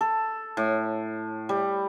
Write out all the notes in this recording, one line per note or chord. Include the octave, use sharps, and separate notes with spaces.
A4
A2
G3